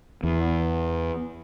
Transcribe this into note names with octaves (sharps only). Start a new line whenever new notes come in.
E2